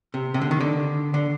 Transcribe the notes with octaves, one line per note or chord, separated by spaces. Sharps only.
C3
C3
D3
D#3
D3
D3